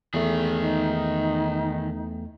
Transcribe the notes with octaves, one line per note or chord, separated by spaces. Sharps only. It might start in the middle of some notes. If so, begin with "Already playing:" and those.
E2 D#3 A3 G#4
D#4